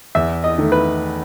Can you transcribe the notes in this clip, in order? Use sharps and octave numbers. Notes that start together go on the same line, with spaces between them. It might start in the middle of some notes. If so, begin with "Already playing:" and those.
E2 E5
D#5
D#3 A3
B4